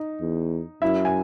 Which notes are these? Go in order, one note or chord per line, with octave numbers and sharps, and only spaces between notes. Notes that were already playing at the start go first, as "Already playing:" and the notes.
Already playing: D#4
E2
F#2 E4 E5
G#5